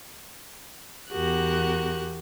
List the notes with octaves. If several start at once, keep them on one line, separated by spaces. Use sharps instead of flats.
E2 B3 F#4 G4 A#4 F#6